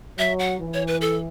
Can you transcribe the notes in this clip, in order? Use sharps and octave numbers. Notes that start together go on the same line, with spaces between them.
F#3 E5
F#5
E3
C#5
B4
A4